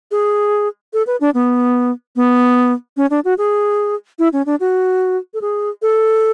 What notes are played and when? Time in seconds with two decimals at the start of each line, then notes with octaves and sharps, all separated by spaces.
0.11 G#4
0.93 A4
1.07 B4
1.21 D4
1.34 B3
2.16 B3
2.97 C#4
3.10 D4
3.25 F#4
3.38 G#4
4.19 E4
4.33 C#4
4.46 D4
4.60 F#4
5.34 A4
5.42 G#4
5.82 A4